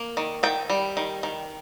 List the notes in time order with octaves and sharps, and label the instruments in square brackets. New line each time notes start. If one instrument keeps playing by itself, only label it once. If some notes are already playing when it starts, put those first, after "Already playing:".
Already playing: [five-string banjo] A#3
D#3
D#3 G5
G3
D#3
D#3